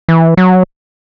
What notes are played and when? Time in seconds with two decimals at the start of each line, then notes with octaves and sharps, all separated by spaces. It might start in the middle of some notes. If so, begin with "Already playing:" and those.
0.08 E3
0.37 F#3